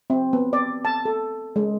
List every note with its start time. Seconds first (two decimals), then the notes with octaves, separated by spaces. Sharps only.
0.10 C4
0.33 B3
0.53 D5
0.85 A5
1.05 A4
1.56 G#3